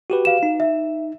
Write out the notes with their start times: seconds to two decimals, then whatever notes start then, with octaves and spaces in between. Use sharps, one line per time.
0.10 F#4 G4 B4
0.25 F5 E7
0.43 D#4
0.60 E5